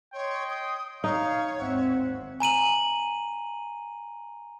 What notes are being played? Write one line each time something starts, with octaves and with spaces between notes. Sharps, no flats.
C#5 D#5 G5 C6
D#6
D#4 C#5 F5
G#1 D#2 C4 E5 F#5
G#5 A#5 D#7 F#7